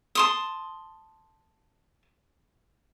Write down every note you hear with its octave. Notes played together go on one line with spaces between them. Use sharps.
A5 C6 D#6